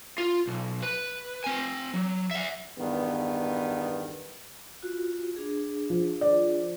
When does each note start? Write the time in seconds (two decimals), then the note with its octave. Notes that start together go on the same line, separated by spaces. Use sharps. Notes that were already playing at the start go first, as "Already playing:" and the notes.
0.18 F4
0.47 B1
0.83 B4
1.44 C4 G#5
1.94 F#3
2.31 E5 F#5
2.78 E2 G2 D#3 B3
4.82 F4 F#4
5.36 D4 G#4
5.90 F3
6.21 D5